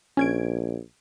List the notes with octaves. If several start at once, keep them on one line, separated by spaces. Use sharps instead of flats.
A#1 C#4 G#6 D7